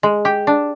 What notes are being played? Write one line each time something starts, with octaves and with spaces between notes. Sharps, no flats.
G#3
G4
D4